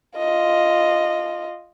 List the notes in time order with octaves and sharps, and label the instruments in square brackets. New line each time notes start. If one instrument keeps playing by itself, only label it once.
[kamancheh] F4 D#5